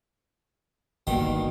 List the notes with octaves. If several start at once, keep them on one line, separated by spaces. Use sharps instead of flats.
G1 B2 D#3 G3 A#3 C6